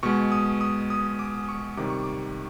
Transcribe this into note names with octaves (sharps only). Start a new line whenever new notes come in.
B2 G#3 C#6
D#6
D#6
D#6
D6
C#6
C3 D#3 G3 D6
C#6
D6